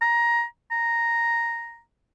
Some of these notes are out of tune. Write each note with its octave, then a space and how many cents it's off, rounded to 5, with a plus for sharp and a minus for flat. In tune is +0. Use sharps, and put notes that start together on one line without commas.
A#5 +15
A#5 +0